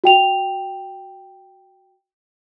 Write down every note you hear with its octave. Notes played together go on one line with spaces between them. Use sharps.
F#4 G5 F7